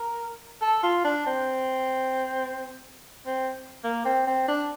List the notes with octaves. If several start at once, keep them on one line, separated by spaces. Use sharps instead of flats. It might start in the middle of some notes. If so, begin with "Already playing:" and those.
Already playing: A#4
A4
F4
D4
C4
C4
A#3
C4
C4
D4